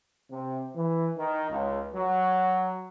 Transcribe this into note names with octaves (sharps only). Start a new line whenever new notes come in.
C3
E3
D#3
C#2
F#3